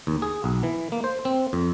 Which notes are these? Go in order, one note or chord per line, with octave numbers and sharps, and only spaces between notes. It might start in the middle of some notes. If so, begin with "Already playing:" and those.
D#2
G#4
B1
E3
A#3
C5
C4
F2